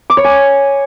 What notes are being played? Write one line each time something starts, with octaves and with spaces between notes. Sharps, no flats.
D6
C#5
G#5